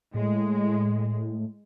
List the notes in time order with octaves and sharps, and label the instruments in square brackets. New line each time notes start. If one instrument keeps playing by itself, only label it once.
[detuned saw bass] A2 [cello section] G#3